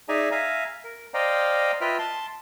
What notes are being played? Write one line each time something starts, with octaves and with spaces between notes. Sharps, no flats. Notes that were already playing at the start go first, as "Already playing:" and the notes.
D#4 G#4 D5 E5 G#5 A#5
E5 F5 G#5 A#5
A#4
C5 D5 D#5 F5 G5 A#5
F4 B4 D#5 E5 G5 F6
A5 C6